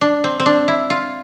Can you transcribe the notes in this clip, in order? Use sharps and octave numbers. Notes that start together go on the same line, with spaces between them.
D4
C4
C4
D4
E4
F4